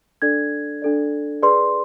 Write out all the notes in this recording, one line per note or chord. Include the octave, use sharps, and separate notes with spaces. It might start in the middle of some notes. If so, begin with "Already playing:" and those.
D4 A4 D5 G#6
D4 A4 D5
G#4 B4 D5 C6